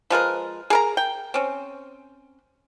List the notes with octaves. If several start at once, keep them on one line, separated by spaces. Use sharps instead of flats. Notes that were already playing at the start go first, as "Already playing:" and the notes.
F3 G#3 A#4 B4
G#4 A#4 A#5
G5
C4 C#4